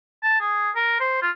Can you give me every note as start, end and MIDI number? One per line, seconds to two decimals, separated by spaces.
0.23 0.39 81
0.40 0.70 68
0.75 0.96 70
1.00 1.20 72
1.22 1.30 65